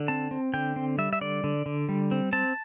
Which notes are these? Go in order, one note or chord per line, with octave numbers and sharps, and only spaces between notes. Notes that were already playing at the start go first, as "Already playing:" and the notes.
Already playing: D3
C4 A5
C4
D3 G5
C4
G3 E5
E5
D3 D5
D3
D3
G3
C4
C4 A5